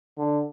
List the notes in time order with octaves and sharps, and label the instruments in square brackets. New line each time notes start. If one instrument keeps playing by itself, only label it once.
[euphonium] D3